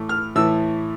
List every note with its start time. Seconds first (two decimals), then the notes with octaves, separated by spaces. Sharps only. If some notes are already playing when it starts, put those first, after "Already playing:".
Already playing: A2 E3 A3 E4
0.09 F6
0.35 A2 E3 A3 E4 E6